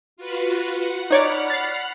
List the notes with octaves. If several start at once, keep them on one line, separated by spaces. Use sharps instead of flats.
F4 F#4 B4
F#5
D#4 C#5 D5 F#5 B5 F6
A6 C7